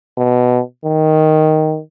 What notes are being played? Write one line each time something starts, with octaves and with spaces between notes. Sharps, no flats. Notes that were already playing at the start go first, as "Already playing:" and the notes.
B2
D#3